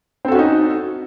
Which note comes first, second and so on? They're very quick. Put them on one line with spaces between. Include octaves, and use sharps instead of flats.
C4 A4 F#4 C#4 D#4